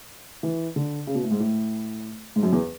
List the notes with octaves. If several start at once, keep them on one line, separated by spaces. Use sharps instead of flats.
E3
D3
C#3
B2
A2
G#2
A2
G#2
F#2
E2